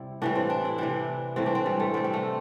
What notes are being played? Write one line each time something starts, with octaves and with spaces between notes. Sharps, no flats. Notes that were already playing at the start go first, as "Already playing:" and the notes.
Already playing: C3 G3 E4
A2 E3 G3 D4
C4
D4
E4
C3 E3 G3 D4
A2 E3 G3 C4
D4
C4
G3
A3
C3 G3 C4
C4
A3